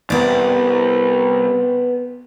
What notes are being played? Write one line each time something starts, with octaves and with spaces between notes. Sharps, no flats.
C2 B3 D5